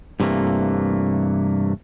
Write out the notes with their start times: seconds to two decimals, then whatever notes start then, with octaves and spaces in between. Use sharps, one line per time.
0.20 G2 C3 E3 A3 A#3